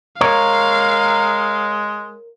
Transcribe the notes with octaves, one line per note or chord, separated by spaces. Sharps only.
G#3 A#4 C#5 F5